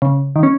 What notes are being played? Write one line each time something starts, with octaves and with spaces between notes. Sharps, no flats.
C#3
D#3
C#4